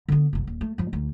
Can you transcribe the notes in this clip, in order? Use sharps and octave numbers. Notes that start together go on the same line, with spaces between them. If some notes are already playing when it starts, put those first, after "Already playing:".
D3 B3
G1 C2
D#1
A3
G2 F3
D2 D#4